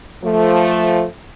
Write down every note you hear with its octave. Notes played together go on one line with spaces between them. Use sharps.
F3 A3